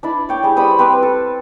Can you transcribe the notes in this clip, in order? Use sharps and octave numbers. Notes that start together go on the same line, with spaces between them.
D4 E4 D5
C#5 G5 D6
G3 G#4
G3 C5 B5 D#6
C4 B4 D6
A4